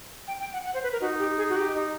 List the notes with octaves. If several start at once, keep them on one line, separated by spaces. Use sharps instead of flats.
G5
G5
F#5
F#5
C5
B4
A#4
D#4 F#4
G4
G#4
F#4
G4
D#4